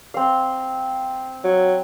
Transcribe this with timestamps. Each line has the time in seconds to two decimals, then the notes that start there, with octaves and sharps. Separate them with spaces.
0.14 C4 F5
1.44 F#3